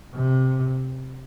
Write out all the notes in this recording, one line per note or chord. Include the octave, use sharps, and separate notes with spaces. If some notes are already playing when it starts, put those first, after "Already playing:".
C3